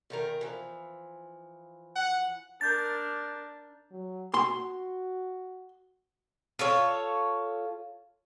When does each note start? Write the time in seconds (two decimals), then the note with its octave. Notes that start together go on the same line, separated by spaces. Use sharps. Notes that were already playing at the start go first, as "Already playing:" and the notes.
0.10 E2 D#3 A#4
0.41 E3 F3
1.95 F#5
2.61 D4 A#4 G6 A6
3.91 F#3
4.34 F#4 C6
6.59 F4 A4 C#5